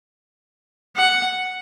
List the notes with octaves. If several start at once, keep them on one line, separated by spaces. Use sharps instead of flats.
F#5